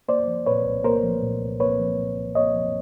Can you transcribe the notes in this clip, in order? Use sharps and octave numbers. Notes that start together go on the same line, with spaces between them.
A#3 C5 D5
F3
A#2 B4 C#5
C2
A#3 A#4 C5
F3
A#2
C2
A#3 B4 C#5
F3
A#2
C2
A#3 C#5 D#5
F3